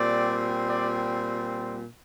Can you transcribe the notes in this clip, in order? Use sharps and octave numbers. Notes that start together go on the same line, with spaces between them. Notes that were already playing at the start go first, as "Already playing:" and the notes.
Already playing: A#2 G3 C4 D5
D5